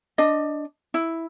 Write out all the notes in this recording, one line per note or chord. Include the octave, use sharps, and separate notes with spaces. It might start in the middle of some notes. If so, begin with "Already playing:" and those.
D4 D#5
E4